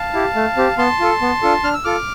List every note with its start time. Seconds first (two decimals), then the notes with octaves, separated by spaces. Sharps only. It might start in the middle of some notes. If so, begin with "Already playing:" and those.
Already playing: F5 A5
0.13 E4 G4
0.35 A3
0.57 C4 G4
0.78 B3 A5 C6
1.00 F4 A4
1.21 B3
1.42 D4 F4 A4
1.64 D4 F6
1.74 E6
1.84 F4 A4 D6 F6